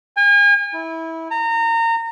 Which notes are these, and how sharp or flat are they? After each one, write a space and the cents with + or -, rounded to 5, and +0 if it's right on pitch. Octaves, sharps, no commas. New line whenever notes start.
G#5 -40
E4 -20
A#5 -25